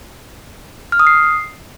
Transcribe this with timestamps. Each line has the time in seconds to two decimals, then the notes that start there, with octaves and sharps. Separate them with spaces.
0.92 F6
1.00 D#6
1.07 C7